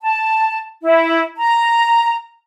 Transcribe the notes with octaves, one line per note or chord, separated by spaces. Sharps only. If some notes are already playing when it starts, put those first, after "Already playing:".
A5
E4
A#5